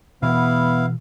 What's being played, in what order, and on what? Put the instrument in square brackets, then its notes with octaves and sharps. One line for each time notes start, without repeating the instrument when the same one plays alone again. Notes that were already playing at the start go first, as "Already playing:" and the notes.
[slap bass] B2 E3 [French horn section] B3 [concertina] E4 F5